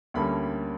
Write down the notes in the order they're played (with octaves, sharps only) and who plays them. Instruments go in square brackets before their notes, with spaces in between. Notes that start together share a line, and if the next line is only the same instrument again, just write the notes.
[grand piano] D2 D3 G3 A#3 C#4 B5